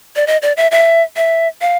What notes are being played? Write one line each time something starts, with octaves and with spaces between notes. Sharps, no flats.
D5
D#5
D5
E5
E5
E5
F5